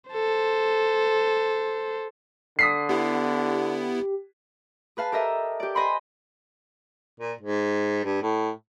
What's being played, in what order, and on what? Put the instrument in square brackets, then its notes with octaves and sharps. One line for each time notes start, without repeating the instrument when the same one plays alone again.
[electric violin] A4 C5
[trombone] D3 [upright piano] D#6 B6 C7
[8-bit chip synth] B3 E4 [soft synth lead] G4
[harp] G#4 B4 F5 A5
G4 A4 A#4 D#5 E5
G4 D5
C5 D#5 G#5 B5 C6
[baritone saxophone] A#2
G#2
G2
A2